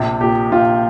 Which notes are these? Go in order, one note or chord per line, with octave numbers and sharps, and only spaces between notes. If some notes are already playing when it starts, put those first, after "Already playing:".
Already playing: A#1 C3
A#2 G4
A#1 F4